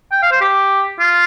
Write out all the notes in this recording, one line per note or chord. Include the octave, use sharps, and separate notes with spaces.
G5
F5
C5
G4
F4